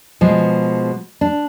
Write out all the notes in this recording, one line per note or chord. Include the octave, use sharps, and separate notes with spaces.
B2 F3 G#3
D4